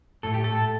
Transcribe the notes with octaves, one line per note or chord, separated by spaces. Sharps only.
A2 A3 A4
G4
A4